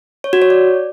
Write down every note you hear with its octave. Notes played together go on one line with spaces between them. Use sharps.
C#5
F#4
C#5
D5